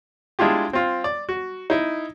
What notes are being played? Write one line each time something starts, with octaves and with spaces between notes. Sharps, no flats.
G#3 D4 E4 F4 G4
C4 F4
D5
F#4
D#4 E4